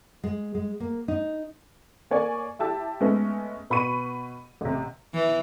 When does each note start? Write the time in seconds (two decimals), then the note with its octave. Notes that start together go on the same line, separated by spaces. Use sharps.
0.24 G#3
0.55 G#3
0.80 A#3
1.08 D#4
2.11 A#3 C#5 D5 G#5
2.59 E4 G4 A5 E6
3.01 G#3 A3 B3 C#4
3.70 B2 B5 C#6 D#7
4.61 A1 C3
5.14 E3